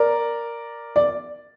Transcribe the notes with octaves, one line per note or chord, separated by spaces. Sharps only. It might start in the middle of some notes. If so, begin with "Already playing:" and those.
Already playing: A#4 D5
D5